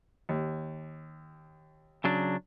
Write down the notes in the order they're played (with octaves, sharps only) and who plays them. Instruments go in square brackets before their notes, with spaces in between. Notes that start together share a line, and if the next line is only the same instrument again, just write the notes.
[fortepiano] D#2
[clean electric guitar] C#3 F#3 D4